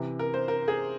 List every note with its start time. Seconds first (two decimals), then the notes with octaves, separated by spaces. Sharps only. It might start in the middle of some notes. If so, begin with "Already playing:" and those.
Already playing: C3 E3
0.19 A#4
0.34 C5
0.48 A#4
0.68 G#4